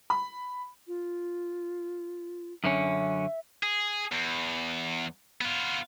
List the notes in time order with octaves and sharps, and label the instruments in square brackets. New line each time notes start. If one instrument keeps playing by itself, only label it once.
[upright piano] B5
[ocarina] F4
[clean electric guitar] F#2 D3 C#4 [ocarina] E5
[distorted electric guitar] G#4
E2
B3 F4